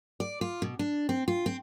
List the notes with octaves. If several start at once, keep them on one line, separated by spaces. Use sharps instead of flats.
D5
F4
B2
D4
C4
F4
C4